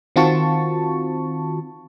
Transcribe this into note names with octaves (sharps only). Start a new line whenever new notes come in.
D#3 C4 F4 F#4 A5 C#6